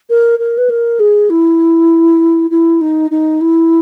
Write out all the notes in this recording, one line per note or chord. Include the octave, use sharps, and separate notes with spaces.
A#4
A#4
B4
A#4
G#4
E4
E4
D#4
D#4
E4